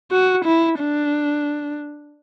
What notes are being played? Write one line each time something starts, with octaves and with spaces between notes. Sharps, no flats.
F#4
E4
D4